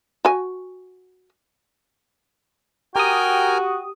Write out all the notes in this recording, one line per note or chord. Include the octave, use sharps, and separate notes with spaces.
F#4 G#5
F#4 G4 A#4 G5 G#5 A#5 D#6